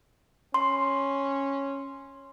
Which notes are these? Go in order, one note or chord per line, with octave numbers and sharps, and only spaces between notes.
C#4 C6